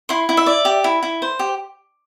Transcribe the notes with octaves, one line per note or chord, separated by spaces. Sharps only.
E4 C6
E4
E5
D5
G4
E4
E4
C5
G4